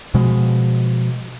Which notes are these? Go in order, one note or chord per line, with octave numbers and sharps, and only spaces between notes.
B2 F3 G#3